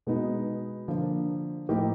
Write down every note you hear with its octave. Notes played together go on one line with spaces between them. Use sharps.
B2 G#3 B3 D#4
D3 F3 A#3
A2 F3 A#3 D#4 G4